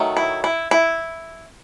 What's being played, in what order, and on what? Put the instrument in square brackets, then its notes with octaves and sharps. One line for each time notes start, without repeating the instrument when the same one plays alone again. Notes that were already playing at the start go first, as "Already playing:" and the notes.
Already playing: [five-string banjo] D#3 F#3 A3
E4
E4
E4